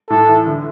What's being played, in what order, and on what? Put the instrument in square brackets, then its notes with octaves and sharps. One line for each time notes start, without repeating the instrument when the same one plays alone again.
[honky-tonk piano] A2 [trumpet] A4
[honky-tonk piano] E3
D3